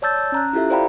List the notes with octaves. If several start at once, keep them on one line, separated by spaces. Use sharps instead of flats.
C#5 D5 A5 E6 G6 A6
C#4 A#5 F#6
E4 F4 G4 A4 E5
C5 D5 F5 G5 A#5 B5